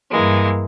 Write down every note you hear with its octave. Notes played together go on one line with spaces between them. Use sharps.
G2 E3 G#3 A#3